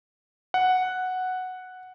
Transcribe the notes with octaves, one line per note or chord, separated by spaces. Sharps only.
F#5